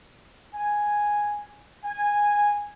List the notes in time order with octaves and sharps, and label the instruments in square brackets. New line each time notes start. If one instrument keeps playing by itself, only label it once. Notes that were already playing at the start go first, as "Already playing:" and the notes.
[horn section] G#5
G#5